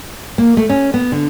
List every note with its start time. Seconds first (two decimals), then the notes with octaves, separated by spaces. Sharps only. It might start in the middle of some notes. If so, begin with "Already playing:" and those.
0.38 A#3
0.57 A3
0.69 C#4
0.94 B3
1.12 D3